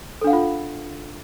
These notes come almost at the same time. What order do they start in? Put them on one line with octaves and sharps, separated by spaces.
A4 D4 F5 F#5 F4